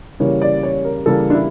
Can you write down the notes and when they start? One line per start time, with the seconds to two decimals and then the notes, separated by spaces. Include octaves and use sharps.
0.20 C#3 E3 G3 A#3 C#5
0.42 D5
0.63 C#5
0.85 A#4
1.06 C#3 E3 G3 A#3 A4
1.30 D4
1.35 E4